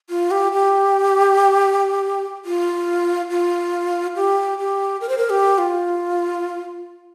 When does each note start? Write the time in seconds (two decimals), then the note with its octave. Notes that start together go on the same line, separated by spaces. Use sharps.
0.10 F4
0.31 G4
0.52 G4
2.45 F4
3.30 F4
4.16 G4
4.58 G4
5.01 A#4
5.09 C5
5.17 A#4
5.30 G4
5.58 F4